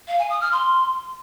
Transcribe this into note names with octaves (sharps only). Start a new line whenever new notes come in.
F5
G#5
D#6
F6
C6